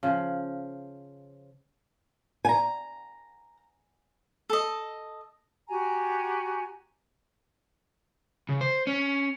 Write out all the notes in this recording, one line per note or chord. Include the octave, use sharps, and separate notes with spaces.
C#3 F3
G#5 A#5
A4 D#5
F#4 G4 G#5 A#5
C#3
C5
C#4